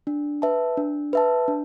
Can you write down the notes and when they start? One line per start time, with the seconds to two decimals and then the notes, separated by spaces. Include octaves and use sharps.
0.07 D4
0.42 B4 E5 A5
0.77 D4
1.13 B4 E5 A5
1.48 D4